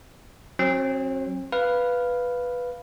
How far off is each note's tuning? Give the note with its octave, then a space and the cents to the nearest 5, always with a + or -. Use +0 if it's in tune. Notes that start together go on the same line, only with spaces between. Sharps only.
F#3 +0 C4 +40
B4 +0 F5 +0